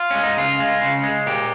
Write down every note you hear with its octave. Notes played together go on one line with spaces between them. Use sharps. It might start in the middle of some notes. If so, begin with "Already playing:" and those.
Already playing: F4
G#3 C#4
D#4
C#3 F4
G#3
C#3
G#3
A#2 G4